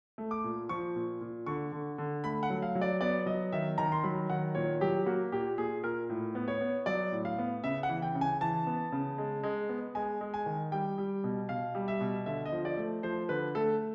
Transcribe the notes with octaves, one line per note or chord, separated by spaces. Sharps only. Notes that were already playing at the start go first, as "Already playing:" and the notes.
A3
D6
A#2
F3 C#6
A#2
A#2
D3 C#6
D3
D3
A3 B5
F#5
F#3
F5
F#3
D5
B3 D5
F#3 D#5
D#3 E5
D#3 A#5
C6
F#3 B5
D#3 F#5
A#2 C#5
F#3 G4
A#3 F#4
A#2 G4
A#2 G#4
A#2 A#4
A2
B3
C#5
B3
F#3 D5
A2
F5
B3
C#3 E5
F#5
E3
G5
C#3
G#5
E3 A5
B3
C#3
G#3
G#3
B3
G#3 G#5
G#3
G#5
D#3
G3 G5
G3
B2
B2 F5
G3
E5
B2
D3 E5
D#5
F3
D5
A3
F3 C5
D3 B4
A3 A4